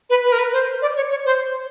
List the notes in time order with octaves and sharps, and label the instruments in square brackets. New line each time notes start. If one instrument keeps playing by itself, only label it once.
[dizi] B4
B4
A#4
B4
C5
D5
C#5
C#5
C5